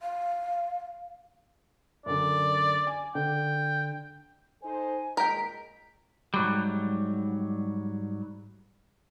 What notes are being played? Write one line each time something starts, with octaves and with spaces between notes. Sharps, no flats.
F5
F#2 D3 D5
G#5
D3 G5
D#4 A4 C5 G#5
A#2 D#3 G#3 A#4 G5 B6
G#2 F#3 G3